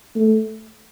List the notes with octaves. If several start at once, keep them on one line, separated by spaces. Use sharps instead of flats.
A3